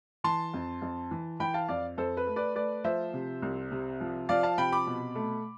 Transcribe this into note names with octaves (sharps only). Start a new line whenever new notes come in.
E3 A5 C6
F2
F2
E3
E3 G5 B5
F5 A5
F2 D5 F5
F2 A4 C5
B4
A3
B4 D5
A3 B4 D5
F3 C5 E5
C3
C2
C3
F3
F3 D5 F5
F5 A5
C3 G5 B5
B5 D6
B2
A3